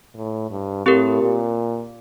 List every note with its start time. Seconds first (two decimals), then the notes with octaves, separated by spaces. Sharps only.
0.15 A2
0.50 G2
0.86 A2 C4 G4 A#4
1.20 A#2